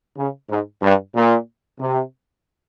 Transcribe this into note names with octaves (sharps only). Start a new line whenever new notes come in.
C#3
G#2
G2
A#2
C3